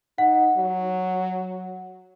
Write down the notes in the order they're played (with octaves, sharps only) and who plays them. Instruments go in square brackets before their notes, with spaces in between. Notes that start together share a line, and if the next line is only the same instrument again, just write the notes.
[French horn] D#4 [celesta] F#5
[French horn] F#3